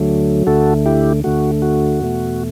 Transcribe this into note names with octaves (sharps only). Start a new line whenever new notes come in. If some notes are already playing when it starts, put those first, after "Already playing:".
Already playing: D2 D3 F#3 A3
D2 D3 A3 F#4 A4
E4 G4
D2 D3 A3 F#4
F#4
E2 B2 A3